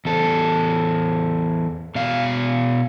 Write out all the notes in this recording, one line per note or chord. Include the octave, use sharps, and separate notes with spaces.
E2 A4
B2 F5